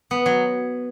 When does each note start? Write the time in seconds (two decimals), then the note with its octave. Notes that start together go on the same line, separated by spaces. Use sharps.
0.11 B3
0.26 F#3